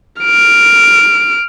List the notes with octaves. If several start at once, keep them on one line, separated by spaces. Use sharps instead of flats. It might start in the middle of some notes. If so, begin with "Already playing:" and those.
F6 D7